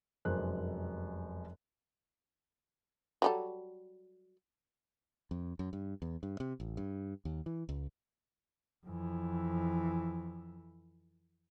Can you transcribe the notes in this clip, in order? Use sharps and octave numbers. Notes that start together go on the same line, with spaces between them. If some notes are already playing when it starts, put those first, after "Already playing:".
F1 F#2 G#3 A#4 C5 F#6
F#3 G3 A4
F2
F#2
G2
E2
G2
C3
A1
G2
D#2
E3
C#2
F2 E3